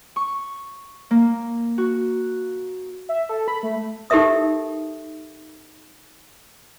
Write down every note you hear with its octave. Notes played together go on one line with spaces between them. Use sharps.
C#6
A#3
F#4
E5
A4
B5
A3
D#4 G4 A4 A#4 E5 D#6